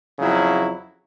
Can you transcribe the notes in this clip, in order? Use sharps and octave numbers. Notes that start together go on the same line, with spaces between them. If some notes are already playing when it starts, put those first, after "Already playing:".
F2 C#3 F#3 E4